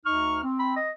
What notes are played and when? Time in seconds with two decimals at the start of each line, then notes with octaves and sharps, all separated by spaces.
0.06 D2 D#4 C#6 F6
0.44 C4
0.59 B5
0.76 D#5